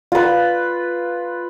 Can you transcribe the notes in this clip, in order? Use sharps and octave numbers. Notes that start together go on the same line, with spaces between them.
F4 B4